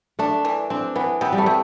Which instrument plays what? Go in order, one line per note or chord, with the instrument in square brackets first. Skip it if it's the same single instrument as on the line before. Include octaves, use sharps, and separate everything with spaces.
[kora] A3 [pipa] D4
[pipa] E3
[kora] C4 [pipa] D4
[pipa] E3 [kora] B3
[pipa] C3 [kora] B3
[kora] G3
A3
[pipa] C3